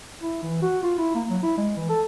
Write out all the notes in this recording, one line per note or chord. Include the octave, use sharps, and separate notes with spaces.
E4
E3
F#4
F4
E4
A#3
F#3
E4
G#3
E3
A4